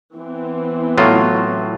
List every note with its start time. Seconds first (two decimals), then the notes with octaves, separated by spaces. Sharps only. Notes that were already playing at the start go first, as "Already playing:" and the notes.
0.16 E3 B3 C4
0.98 A2 F#3 F4